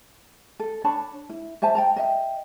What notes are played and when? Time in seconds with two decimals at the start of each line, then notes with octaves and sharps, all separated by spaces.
0.60 A4
0.84 D4 C#5 A5 B5
1.30 E4
1.62 C5 E5 G#5 A5
1.75 G5 A5 A#5
1.96 D#5 E5 G5